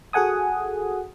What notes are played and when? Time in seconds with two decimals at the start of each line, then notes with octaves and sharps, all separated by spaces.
0.13 F#4 G#4 A4 F#5 G#5 D#6